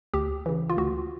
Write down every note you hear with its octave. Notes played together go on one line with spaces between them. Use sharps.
D2 G4
C#3 E3
F4
D2 F#4